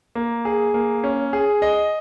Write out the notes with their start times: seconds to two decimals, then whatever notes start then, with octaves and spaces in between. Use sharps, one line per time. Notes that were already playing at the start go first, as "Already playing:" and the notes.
0.15 A#3
0.45 G#4
0.74 A#3
1.04 C#4
1.33 G#4
1.62 D#5